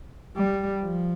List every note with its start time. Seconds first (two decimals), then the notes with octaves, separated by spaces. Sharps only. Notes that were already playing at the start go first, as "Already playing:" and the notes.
0.36 G3
0.83 F3